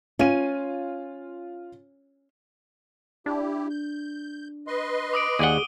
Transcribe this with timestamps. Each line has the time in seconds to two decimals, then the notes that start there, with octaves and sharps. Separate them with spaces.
0.19 C#4 F4 D#7
3.26 D4 E4 G4
3.70 G6
4.67 B4 D#5 C6
5.13 D6 D#6 D7
5.39 D#2 G#4 D5 F#5 D#7 G7